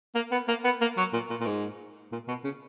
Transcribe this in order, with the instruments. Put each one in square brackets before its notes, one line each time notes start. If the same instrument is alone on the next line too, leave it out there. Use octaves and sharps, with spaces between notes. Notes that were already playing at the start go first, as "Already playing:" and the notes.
[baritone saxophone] A#3
B3
A#3
B3
A#3
F#3
A#2
A#2
A#2
G#2
A#2
B2
C#3